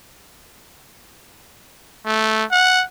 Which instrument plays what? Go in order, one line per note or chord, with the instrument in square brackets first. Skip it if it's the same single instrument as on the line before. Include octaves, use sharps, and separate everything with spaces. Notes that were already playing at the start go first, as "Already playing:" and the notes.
[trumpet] A3
F#5